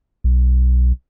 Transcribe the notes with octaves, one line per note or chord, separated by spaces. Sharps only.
B1